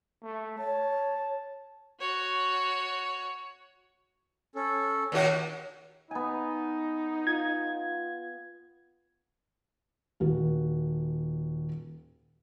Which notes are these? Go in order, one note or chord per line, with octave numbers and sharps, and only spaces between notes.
A3
C#5 A5
F#4 C#5
C#4 A4
D#2 A#2 F#4
B3 D#4 G#5
F4 G#6
D#1 F#4